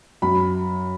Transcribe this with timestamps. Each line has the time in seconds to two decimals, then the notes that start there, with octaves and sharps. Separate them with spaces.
0.22 F#2 B5